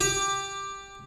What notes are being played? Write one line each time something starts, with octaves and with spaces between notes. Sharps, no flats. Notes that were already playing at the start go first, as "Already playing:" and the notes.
G4